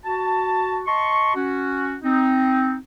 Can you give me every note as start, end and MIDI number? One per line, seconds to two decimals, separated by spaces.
0.05 0.80 66
0.05 0.80 81
0.86 1.32 75
0.86 1.32 81
0.86 1.32 84
0.86 1.32 85
1.35 1.96 61
1.35 1.96 66
2.03 2.76 60
2.03 2.76 63